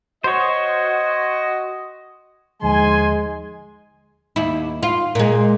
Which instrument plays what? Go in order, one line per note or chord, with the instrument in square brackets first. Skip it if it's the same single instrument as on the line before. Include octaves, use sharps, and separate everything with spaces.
[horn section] F#4 D#5 [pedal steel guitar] C5 C#5
[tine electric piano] D#2 D3 F3 [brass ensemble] G#2 G#5 [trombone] G#3 [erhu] C6
[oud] D#2 E4
F4
A#2 G#3